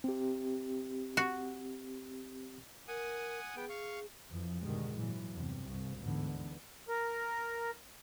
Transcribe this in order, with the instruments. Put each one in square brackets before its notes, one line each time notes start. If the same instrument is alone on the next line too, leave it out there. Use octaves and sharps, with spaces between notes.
[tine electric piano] C4 G4
[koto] F#4
[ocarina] A#4 [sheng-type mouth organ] F#5 G#5 D#6
[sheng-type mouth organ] B3 G5 [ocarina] G#4
[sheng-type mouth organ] F5 C#6
[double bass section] F2 E3 F3
G#2 B2 D3 D#3 G3 G#3
A#2 E3 F#3
E2 G2 C3
C2
D2 G#2 D3 E3 B3
[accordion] A#4